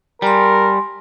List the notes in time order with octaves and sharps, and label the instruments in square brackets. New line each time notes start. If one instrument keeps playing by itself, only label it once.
[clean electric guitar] G3 [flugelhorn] A#4 [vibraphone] G#5 C6